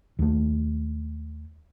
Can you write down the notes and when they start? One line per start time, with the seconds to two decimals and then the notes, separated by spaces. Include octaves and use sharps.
0.19 D#2 A3